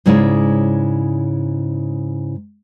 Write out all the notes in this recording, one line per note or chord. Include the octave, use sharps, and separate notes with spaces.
G#2 C#3 G#3 E4 C#5 D5